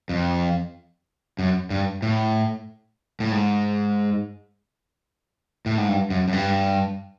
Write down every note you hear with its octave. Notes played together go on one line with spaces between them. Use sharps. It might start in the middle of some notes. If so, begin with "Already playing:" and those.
F2
F#2
G2
A2
A2
G#2
A2
G#2
G2
F#2
F#2
G2